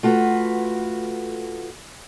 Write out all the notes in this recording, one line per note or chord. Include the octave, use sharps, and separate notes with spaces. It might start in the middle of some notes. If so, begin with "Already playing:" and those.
A3 F4 F#4 B4